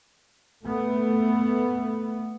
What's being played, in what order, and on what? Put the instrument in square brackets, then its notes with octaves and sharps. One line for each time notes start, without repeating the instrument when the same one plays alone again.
[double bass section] A3 B3